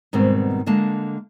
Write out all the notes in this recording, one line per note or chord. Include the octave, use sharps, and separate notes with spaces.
G#2 B2 D#3 G3 B3 C4
D3 G#3 A#3 A5